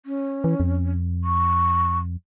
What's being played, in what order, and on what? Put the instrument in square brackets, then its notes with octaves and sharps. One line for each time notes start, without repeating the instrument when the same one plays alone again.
[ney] C#4
[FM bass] E3
F2
[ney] C#6